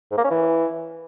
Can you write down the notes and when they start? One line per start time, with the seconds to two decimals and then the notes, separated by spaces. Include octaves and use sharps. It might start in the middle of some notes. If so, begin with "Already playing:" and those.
0.11 G#2
0.18 A#3
0.24 C#4
0.31 E3